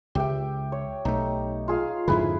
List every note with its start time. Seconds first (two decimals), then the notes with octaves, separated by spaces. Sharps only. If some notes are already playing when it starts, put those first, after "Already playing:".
0.15 C#2 G4 E5 G5
0.72 C#5
1.05 B1 A3 D#4
1.68 F4 G#4 F5
2.08 F2 G#2 D3 E4 G#4 B4